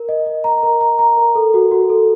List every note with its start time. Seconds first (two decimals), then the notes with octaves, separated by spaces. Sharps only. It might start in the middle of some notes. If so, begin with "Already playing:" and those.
Already playing: A#4
0.09 D#5
0.26 D#5
0.44 A#5
0.63 A#4
0.81 A#5
0.99 A#5
1.17 A#4
1.35 A4
1.54 F#4
1.71 F#4
1.90 A4